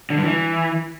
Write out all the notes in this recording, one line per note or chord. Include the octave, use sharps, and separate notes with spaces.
D3
G2
E3